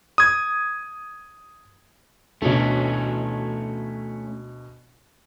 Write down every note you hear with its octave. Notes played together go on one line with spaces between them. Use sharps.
D#6 G#6
D2 B2 A3 C#4